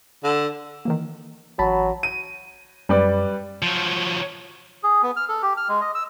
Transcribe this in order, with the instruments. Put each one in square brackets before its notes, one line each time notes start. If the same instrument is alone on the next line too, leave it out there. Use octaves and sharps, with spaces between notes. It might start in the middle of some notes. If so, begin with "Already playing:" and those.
[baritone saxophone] D3
[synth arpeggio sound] D#3 E3 A#3
[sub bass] A1 [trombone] F#3 [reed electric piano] A5 B5
[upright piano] D#7
[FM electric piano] F#2 [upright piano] G3 B4 D5
[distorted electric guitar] F3 F#3
[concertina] G#4
B3
F6
A4
G4
F6
G#3
D#5
E6